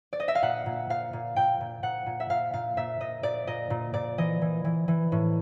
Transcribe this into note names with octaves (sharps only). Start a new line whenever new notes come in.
D5
D#5
E5
F5
A#2 F#5
A#2
A#2 F5
A#2
A#2 G5
A#2
A#2 F#5
A#2
E5
A#2 F5
A#2 F5
A#2 E5
A#2 D#5
A#2 D5
A#2 D#5
A#2
A#2 D5
E3 D#5
E3
E3
E3
A2